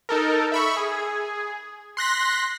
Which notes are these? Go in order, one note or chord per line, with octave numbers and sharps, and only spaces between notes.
D#4 A4 A#4
E5 B5 C#6
G#4
C6 F#6 A#6 B6